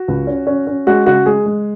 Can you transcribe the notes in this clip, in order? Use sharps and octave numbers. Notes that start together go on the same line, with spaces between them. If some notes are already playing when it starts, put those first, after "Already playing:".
Already playing: F#4
C#2
C#4
C#4
C#4
G#3 F#4
C#3 F#4
G#3 G#4
G#3